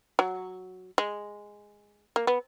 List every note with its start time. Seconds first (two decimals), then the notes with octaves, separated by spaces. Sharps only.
0.19 F#3
0.98 G#3
2.16 A#3
2.27 B3